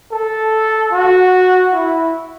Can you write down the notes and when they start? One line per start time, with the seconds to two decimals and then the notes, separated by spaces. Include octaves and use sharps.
0.12 A4
0.92 F#4
1.73 E4